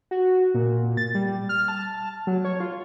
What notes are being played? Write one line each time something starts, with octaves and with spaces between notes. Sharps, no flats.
F#4
A#2
A6
G3
F6
A5
F#3
C#5
F4